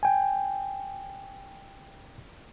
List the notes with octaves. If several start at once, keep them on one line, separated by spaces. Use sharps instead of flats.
G5 G#5